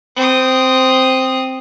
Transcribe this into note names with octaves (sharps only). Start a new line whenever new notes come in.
C4 D#6